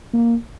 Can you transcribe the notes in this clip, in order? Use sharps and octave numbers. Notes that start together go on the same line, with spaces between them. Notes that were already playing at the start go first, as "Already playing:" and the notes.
A#3